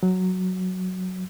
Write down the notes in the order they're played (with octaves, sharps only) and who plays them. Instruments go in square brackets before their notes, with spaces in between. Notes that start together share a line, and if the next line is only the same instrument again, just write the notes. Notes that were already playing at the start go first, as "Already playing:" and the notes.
[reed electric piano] F#3